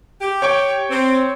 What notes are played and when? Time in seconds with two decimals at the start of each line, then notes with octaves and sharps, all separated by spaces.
0.21 G4
0.42 C#5 G5 C#6
0.90 C4